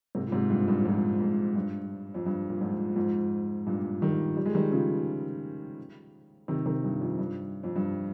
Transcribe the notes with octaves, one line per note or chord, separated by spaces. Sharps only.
G#2 C3
A#2
G#2 C3
G2 A#2
G2 A#2
A#2
F2 G#2
F2 G#2
G2
F2
G2
A#2
F2 G#2
F2 G#2
G2 A#2
D#3 G3
G3
G#3
D#3 G3
C#3 F3
C3 D#3
C3 D#3
G2
F2
G2
F2
G2